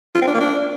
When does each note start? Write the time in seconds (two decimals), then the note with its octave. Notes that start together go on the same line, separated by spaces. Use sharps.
0.15 F4
0.21 C4
0.28 D4
0.34 A#3
0.40 D4